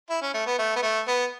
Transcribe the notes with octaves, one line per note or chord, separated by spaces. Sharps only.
E4
C#4
A3
B3
A3
B3
A3
B3